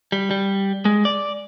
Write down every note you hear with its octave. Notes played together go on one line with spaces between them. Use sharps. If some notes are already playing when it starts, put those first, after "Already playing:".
G3
G3
G#3
D5